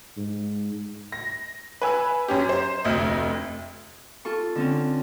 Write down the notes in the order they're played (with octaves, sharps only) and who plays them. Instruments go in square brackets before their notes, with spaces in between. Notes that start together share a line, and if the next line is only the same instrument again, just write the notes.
[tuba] G#2
[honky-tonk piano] A#6
B4 G#5 E6
F#2 C#4 G4
C5
F1 D2 D#5
[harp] F4 A4 C#6
D3 C4 C#4